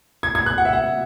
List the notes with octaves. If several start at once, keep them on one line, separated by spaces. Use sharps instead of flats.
G#6
G#6
F#6
F#5
E5
F#5